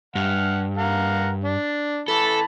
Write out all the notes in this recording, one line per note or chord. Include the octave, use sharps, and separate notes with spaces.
G2 F#5 F6
A#4 F5 F#5
D4
E3 A4 A5 B5